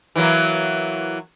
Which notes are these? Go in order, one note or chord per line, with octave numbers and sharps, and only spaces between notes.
E3 F#3 A#3